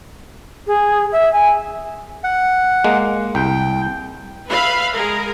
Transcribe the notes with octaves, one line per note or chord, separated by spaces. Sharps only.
G#4
E5
G#5
F#5
G#3 A#3
C2 G5
B4 E5 F5 B5
G#3 G#4 A#4